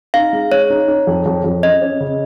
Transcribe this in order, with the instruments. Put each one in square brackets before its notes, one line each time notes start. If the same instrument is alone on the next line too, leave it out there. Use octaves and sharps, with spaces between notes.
[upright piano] D#4 [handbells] F5
[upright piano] G#3
[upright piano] G#3 [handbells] C#5
[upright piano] D#4
D#4
F2
F2
F2
[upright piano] C#4 [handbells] D#5
[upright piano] C#4
C#3